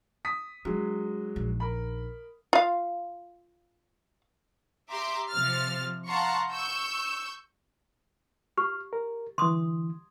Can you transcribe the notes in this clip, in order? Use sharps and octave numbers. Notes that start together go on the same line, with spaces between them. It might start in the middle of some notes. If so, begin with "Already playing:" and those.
D#6 B6
F#3 G#3 D4
A#1 D#4
A#4 B5
F4 F5
G4 E5 A#5 C6 D6
C3 F3 C5 F6 A6
F5 F#5 A5 A#5 C6 C#6
C#6 E6 G6
G4 F6
A#4
D3 E3 C6 D#6